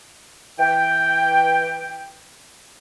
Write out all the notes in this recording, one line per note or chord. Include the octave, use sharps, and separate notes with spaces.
E3 G5